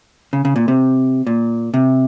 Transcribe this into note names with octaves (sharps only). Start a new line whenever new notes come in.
C#3
C#3
A#2
C3
A#2
C3